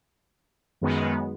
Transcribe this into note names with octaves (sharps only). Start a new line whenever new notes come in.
F#2 D#3 G#3 B3